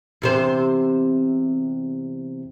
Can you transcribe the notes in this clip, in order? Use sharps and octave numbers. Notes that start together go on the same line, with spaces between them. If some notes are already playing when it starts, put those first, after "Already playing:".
E2 C3 C5